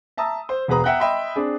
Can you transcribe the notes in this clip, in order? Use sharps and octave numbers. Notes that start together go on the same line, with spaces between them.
E5 A5 A#5 D#6 E6
C5
E1 B3 G#4 B4 A#5 D#6
E5 F#5 G5 A#5 F#6
D#5 E5 G5 B5 C6
C4 D4 G#4